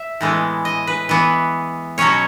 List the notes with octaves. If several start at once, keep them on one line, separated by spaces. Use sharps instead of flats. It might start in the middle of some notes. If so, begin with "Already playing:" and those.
Already playing: E5
A2 E3 G#3 B3
D#5
B4
E3 B3
B2 F#3 C#4 C#5